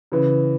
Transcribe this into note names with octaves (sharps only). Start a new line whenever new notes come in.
C#3 E3